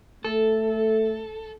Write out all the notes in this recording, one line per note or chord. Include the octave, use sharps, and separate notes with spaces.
A3 A4